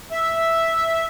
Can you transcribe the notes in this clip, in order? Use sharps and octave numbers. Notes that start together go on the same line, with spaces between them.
E5